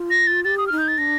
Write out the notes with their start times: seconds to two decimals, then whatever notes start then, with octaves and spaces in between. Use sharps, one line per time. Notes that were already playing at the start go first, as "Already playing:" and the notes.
Already playing: F4
0.11 A#6
0.27 A6
0.45 G4 A6
0.58 D#6
0.67 D#4 F6
0.78 G6
0.88 A6
0.98 D4 A#6